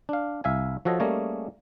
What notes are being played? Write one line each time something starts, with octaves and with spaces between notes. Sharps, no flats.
D4 F5
C2 E5 F5 G#5
F3 F#4 A4 C#5 D#5
G3 A3 A#3 C#4 G#4 D#5